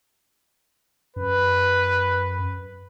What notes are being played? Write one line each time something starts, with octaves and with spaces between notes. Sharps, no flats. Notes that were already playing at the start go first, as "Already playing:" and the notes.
F#2 B4